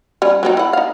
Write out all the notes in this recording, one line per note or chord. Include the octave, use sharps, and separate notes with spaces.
G3 C#4 D#4
F#3 C4 D#4
E4 F#5
D#4 F5